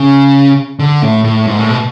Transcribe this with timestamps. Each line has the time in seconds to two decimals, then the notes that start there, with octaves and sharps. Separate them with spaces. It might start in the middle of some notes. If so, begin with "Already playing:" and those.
Already playing: C#3
0.79 D3
1.02 A2
1.24 A2
1.47 G#2
1.58 A2
1.70 B2